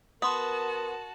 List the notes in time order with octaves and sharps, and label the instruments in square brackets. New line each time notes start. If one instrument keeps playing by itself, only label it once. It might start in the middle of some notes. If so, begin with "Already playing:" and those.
[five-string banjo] B3 [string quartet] F#4 A5 [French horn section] A#4 [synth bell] C6 D#6